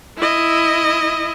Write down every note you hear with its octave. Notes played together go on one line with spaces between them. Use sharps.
E4 D#5